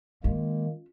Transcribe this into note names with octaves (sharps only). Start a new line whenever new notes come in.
D#3 G#3 A#3 C#4 F4